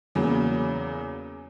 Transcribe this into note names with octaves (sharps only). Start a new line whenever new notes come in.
E2 C#3 F#3 A#3